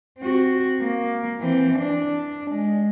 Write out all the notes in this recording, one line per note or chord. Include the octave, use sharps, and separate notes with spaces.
C4 F#4
A#3
E3 C4
D4
G#3